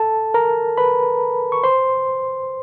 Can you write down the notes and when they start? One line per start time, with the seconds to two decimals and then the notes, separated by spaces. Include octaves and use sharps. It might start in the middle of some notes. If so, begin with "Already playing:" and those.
Already playing: A4 A5
0.34 A#4 A#5
0.78 B4 B5
1.52 C#6
1.64 C5 C6